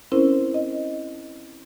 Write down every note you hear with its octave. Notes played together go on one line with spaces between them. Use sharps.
C4 C#4 E4 A#4 C5
D#5